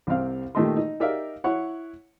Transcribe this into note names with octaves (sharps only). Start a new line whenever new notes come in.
C2 C3 C4 F5
A#2 D#3 A3 G4 D#5 C6
D#4
D#4 G4 A#4 D5 E5 F5
E4 C#5 F#5